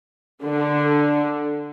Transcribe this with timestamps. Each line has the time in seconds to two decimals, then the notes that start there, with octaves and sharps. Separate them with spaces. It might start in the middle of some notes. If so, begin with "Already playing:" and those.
0.43 D3